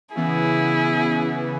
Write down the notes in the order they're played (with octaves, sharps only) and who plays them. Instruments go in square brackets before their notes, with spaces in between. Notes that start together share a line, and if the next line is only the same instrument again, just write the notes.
[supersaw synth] C#3 E3 B3 [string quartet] E4 G#4